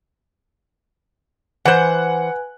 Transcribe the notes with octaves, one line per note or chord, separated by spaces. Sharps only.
E3 B4 C5 F#5 G#5 F#6